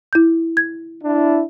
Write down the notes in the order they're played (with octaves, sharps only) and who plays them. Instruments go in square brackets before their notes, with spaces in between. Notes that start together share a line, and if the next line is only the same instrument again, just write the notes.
[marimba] E4 G6
G#6
[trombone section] D4 E4